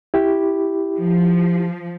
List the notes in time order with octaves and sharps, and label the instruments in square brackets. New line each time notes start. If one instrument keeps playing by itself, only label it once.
[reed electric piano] E4 G4
[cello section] F3